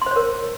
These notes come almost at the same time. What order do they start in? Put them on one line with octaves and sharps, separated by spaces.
C6 C5 C#5 A#4